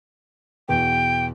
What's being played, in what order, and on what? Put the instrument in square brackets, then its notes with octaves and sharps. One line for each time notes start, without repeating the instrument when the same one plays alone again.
[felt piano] E2 B2 E3 [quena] G5